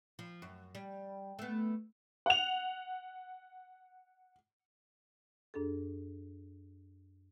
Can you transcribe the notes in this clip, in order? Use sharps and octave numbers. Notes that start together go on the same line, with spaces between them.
F3
F#2
G3
A3 B3
F#5 F7
F#2 D4 G#4 A4